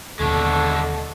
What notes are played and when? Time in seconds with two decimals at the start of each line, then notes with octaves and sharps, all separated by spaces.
0.19 D#2 B2 D3 G#3 A3 D4 A4